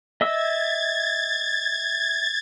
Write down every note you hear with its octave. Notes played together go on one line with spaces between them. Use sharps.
D#5 E5 E6 G#6 A6